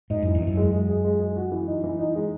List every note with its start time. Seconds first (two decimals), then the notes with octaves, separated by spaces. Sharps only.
0.10 G#2 D#4
0.22 F#2 E3
0.35 E2
0.41 E3
0.47 F#2
0.57 G#3
0.73 G#3
0.89 G#4
1.04 G#3
1.20 G#4
1.36 F#4
1.52 E3
1.68 D#4
1.84 E3
1.99 D#4
2.15 G#3